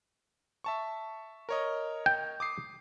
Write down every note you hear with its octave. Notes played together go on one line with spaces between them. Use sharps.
E5 A5 C#6
A#4 C#5 D#5
G5
D6 D#6 C7